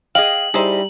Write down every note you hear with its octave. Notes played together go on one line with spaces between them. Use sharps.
G#4 D#5 F5 G5 F#7
G3 D#4 E4 G#4 C5